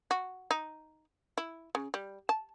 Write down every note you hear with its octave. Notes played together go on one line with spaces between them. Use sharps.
F#4
D#4
E4
C#3
G3
A5